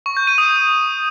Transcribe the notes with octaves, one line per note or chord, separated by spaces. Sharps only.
C#6
G6
D#7
D#6